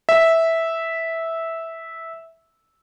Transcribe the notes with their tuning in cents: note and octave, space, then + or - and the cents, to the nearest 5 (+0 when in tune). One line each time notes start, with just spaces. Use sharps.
E5 -10